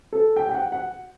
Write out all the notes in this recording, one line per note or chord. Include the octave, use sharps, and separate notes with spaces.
A4
G5
G5
F#5
F#5